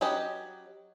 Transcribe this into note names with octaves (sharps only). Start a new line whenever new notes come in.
F#3 C#4 G4 B4 D#5